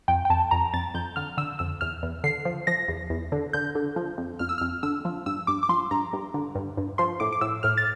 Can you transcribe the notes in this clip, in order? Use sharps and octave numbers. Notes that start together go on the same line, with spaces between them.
F2 G5
G5
F2 A5
F2 A#5
F2 A6
F2 G6
D3 F6
D3 E6
F2 E6
E2 F6
E2
D3 C7
F3
F3 A#6
E2
E2
D3
D3 G6
D3
F3
F2
F2 F6
E6
F2 F6
D3 E6
F3
G2 E6
G2 D6
D6
F3 C6
G2 A#5
G2
D3
G2
G2
F3 C6
A2 D6
D6
A2 E6
A2 F6
A6